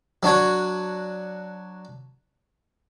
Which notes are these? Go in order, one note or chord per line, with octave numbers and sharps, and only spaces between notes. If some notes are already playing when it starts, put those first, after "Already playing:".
F#3 D4 F#4 C#5